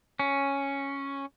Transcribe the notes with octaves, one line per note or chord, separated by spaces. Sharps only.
C#4